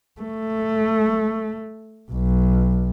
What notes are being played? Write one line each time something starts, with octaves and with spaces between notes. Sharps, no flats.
A3
B1